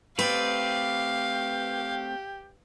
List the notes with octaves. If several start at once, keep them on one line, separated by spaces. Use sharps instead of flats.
A3 C4 G4 B4 D5 F5